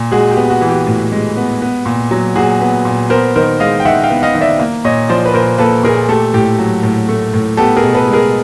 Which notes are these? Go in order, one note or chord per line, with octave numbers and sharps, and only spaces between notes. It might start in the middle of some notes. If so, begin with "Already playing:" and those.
Already playing: A#2
G#3 F#4 G#4
G4
B3
F#4
E3
G4
A2
G#3
B3
B3
A#2
F#3
A#2 F#4 G#4
B3
A#2
B3 A#4 C5
D#3 A#4 C5
G#3 D#5 F5
G5
D#3 E5 F#5
F5 G5
B3
D#5 F5
D#3
D5 E5
A#3
A#2 C#5 D#5
F3 C5 D5
B4
A#2 A#4 C5
A#3 A4 B4
A#2 G#4 A#4
A3 G4 A4
A2 G4
F#3
A2
A3
A2
B3 G4 A4
G#4 A#4
B2
A4 B4
G#3
G#4 A#4